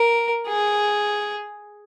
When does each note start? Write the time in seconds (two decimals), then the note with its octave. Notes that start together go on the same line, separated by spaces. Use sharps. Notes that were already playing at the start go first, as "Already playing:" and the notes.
Already playing: A#4
0.48 G#4